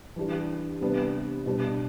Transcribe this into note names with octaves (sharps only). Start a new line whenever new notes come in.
E3 G3 D4 G4
C3 G3 B3 D4
B2 G3 D4